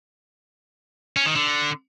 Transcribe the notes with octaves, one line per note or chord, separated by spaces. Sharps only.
C#4
D#3
D3